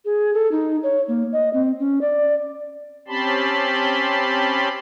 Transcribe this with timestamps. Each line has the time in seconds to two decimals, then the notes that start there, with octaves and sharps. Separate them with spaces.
0.05 G#4
0.34 A4
0.52 D#4
0.83 C#5
1.08 A#3
1.32 D#5
1.53 C4
1.80 C#4
2.01 D5
3.08 C4 C#4 G4 A5 B5 C6